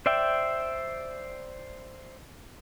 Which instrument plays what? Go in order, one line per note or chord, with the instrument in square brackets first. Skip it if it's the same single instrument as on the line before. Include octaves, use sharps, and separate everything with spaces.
[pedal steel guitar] C5 D5 E5 G5